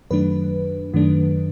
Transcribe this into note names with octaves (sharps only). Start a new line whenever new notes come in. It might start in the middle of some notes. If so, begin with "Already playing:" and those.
F#2 D#3 F#3 A3 D4 B4
F#2 D#3 F#3 A3 D4